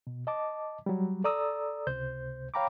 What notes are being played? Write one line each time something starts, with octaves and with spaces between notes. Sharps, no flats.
B2
D#5 A5 D6
F#3 G3
A4 D5 A#5 D#6 E6
C#2 C3 C5 G6
C#5 F5 G5 A#5 B5 D6